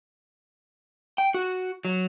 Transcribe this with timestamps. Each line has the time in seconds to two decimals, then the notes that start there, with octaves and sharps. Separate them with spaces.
1.18 G5
1.34 F#4
1.85 F#3